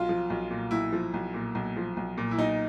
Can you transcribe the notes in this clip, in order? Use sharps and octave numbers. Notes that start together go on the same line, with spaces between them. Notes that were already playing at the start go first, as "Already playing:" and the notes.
Already playing: B1 F4
F3
B1
A#2
B1 E4
F3
B1
A#2
B1
F3
B1
A#2
E4
B1 D#4